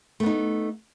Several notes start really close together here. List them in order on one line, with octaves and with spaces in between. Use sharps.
A3 B3 D#4